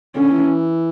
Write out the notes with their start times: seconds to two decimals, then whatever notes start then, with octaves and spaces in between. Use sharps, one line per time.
0.16 D3 C#4
0.32 E3